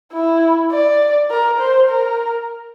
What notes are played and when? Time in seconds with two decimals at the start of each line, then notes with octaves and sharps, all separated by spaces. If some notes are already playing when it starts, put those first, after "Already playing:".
0.13 E4
0.72 D5
1.30 A#4
1.60 C5
1.88 A#4